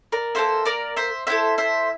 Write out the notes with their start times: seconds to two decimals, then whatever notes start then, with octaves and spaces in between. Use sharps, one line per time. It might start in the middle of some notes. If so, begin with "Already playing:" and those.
0.12 A#4 D5
0.35 A#3 E4 A4 C5 E5
0.66 A#4 D5
0.97 C5 E5
1.27 A#3 E4 A4 C5 E5
1.58 C5 E5